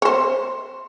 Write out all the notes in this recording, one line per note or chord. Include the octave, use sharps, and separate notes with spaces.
C5 C#5